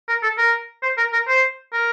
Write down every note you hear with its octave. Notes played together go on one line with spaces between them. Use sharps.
A#4
A4
A#4
C5
A#4
A#4
C5
A#4